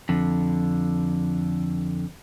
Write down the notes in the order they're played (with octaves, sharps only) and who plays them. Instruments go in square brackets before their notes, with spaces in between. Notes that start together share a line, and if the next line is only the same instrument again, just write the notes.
[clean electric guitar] F2 D3